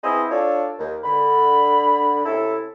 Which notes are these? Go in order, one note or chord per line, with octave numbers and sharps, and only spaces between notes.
B3 C4 E4 G#4 C5 D#5
D4 F4 A4 C#5 D5
D#2
D3 B5
C3 C#4 E4 A4